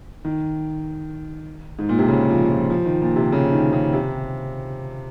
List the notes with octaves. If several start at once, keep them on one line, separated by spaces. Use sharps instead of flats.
D#3
G#2
A#2
C3
C#3
F3
F3
F3
D#3
A#2
C3
C#3
D#3
C#3
C3